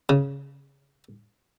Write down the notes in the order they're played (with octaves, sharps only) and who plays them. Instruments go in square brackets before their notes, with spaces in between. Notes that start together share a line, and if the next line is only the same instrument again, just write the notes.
[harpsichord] C#3